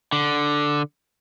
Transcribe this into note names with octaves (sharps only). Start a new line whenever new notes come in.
D3